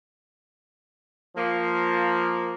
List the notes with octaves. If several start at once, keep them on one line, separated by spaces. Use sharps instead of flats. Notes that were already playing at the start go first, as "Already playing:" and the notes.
F3 A#3